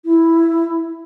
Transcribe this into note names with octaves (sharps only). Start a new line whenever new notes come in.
E4